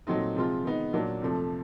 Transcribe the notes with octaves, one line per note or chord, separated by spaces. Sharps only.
A#2 F#3 A3 C4 D#4
C3 F3 G#3 C4 F4
D#3 G#3 B3 D#4
A#2 F#3 A#3 D4
F2 C3 F3 A3